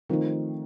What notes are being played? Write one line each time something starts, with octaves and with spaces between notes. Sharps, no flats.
D#3 F3 A3 C4 D#4